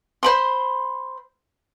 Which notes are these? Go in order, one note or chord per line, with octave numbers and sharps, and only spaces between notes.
C5 B5 C6